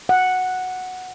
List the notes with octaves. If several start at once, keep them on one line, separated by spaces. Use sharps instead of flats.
F#5